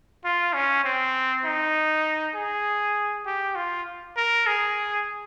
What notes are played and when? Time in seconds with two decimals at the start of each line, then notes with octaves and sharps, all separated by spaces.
0.25 F4
0.54 C#4
0.85 C4
1.45 D#4
2.35 G#4
3.26 G4
3.55 F4
4.17 A#4
4.47 G#4